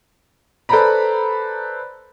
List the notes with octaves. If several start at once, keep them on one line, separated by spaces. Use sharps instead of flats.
A4 B4 C5 D5 A#5 B5